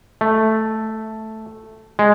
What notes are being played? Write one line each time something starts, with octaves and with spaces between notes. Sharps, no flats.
A3
G#3